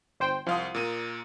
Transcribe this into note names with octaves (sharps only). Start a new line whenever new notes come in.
G1 C5 G5
C2 F3 F5 D#6
A#2 A#3 D#7